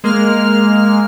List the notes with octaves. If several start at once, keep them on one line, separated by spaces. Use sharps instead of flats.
G#3 A#3 F6